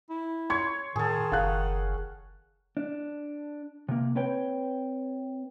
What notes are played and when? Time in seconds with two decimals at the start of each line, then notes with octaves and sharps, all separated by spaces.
0.10 E4
0.50 C#5 C6 G#6
0.96 A2 D#3 G#4 A4
1.32 F#1 F5 F#5 F#6
2.77 D4
3.89 C3 A#3
4.15 C4 B4 C#5 G5